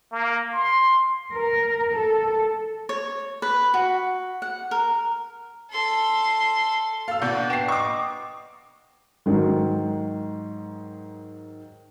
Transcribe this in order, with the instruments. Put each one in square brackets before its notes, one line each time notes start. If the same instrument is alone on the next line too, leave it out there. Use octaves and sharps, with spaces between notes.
[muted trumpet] A#3
C6
[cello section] A#4
A4
[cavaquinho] C#5
B4
F#4
F#5
A#4
[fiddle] A4 C6
[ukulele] A4 [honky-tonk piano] F5 E6
[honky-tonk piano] B2 G6 [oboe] D5 [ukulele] F#5
[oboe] D4
[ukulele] B4 F#5 G5 [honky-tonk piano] C7 E7
[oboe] D#5 [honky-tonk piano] C#6 D6
[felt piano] G#2 D#3 F#3